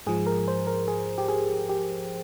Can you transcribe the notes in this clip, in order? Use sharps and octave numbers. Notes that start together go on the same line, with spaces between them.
G#2 F3 G#4
A#4
C5
A#4
G#4
G4
G#4
G4